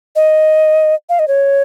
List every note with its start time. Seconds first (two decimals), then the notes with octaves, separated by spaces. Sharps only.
0.16 D#5
1.09 F5
1.19 D#5
1.28 C#5